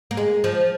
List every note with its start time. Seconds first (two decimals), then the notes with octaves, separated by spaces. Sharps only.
0.11 A#3
0.17 G#3
0.44 F3